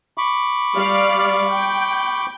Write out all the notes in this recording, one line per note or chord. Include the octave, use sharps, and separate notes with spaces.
B5 C#6 D6
G3 D5 F5
G5